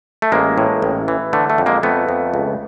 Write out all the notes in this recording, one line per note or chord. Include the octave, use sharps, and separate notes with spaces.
A3
A1 G#3 A#3
A2
A1
E3
D3 A3
A3
F2
G#3 A#3
F2 A3 B3
F2
C#2